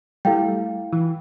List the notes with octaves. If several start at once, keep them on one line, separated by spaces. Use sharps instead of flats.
G3 A3 E4 F5 G5
E3